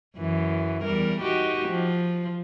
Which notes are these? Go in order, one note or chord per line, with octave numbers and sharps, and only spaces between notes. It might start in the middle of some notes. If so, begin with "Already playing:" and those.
F#2 E3
E2 G3 A#4
D#4 F#4 G4
F3